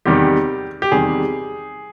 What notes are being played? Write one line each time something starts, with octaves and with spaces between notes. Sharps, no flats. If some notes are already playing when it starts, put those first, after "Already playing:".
E2 C3 D#3 G3 G4
G4
E2 C3 D#3 G3 G#4